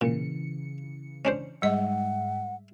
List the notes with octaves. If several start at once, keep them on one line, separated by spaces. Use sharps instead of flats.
A#2 C#3 E3 C#7
C#4 D4 C5
G#2 G3 G#3 D#5 E5 F#5